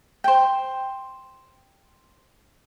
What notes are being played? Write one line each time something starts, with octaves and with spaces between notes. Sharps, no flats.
C5 G5